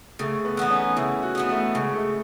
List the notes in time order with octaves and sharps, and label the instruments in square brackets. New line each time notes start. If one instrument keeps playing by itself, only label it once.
[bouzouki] C#3 [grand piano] A3
[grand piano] B3
[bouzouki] E3 B3 D#4
[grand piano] C#4
[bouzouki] C#3 [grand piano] E4
[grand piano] F#4
[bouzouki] E3 B3 D#4
[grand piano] A3
[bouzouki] C#3 [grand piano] G#3
[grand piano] A3